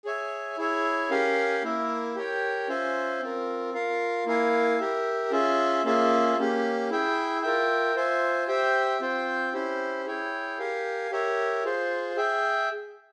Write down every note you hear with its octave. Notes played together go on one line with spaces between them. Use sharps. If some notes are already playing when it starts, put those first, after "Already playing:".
G#4 C#5 E5 G#5
E4 G#4 C#5 E5
C#4 G4 A#4 F5 G#5
A#3 E4 A#4 E5
G4 A#4 C#5 G5
C#4 F4 C5 E5 G#5
C4 F4 A#4
F4 A#4 F5
A#3 E4 A#4 F5 G#5
G4 A#4 E5
C#4 F4 G#4 E5
A#3 C#4 F4 G#4 E5
A#3 C#4 G4
E4 G#4 E5 G5
F4 A#4 E5 G5
F4 C5 E5 G#5
G4 C5 E5 G5
C4 F4 C5 G5
C#4 E4 G4 C5
E4 G#4 C#5 G5
G4 A#4 F5 G#5
G4 A#4 C#5 E5
F4 G#4 C5
G#4 E5 G5